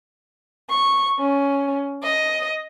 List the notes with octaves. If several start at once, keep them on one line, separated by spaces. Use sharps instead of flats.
C#6
C#4
D#5